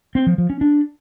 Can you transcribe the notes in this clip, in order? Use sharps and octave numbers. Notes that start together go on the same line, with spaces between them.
C4
F3
F3
C#4
D4